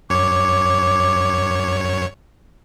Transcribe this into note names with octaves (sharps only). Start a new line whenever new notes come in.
F#2 C#5 D6